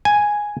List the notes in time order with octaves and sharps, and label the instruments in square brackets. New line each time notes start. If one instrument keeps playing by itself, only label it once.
[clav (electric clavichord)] G#5